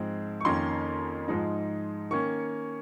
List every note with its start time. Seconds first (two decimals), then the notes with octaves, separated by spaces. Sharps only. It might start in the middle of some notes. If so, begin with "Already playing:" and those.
Already playing: G#2 F3 G#3 C4
0.41 C#6
0.45 F2 D#3 A#3 C#4 C6
1.28 G#2 F3 G#3 D#4
2.11 D#3 A#3 C#4 C#6